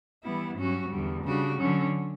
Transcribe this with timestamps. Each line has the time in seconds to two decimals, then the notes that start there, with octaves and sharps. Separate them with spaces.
0.23 E3 G3 B3 E4
0.56 G2 F#3 C#4 F#4
0.90 E2 D3 G3
1.23 C#3 G3 D4 F#4
1.57 D3 F#3 C#4